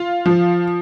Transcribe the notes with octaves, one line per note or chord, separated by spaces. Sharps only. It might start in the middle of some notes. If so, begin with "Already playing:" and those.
Already playing: F4
F3